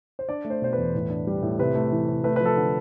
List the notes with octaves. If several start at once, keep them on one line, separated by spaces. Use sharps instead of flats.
C5
D4 D5
A3
C5
B2 C5
E2 B4
A2
D4
G3
A2
C3 B4
A3
E3
C3
A3 B4
F3 B4
A4
D3